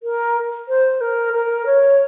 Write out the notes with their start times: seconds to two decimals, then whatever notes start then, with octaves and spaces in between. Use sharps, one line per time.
0.02 A#4
0.68 C5
1.00 A#4
1.33 A#4
1.65 C#5